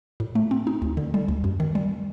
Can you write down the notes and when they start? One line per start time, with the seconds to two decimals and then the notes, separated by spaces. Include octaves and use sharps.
0.20 A2
0.35 A3
0.51 C4
0.67 D#4
0.82 D2
0.97 D3
1.14 G3
1.28 D2
1.44 F#2
1.60 D#3
1.75 G3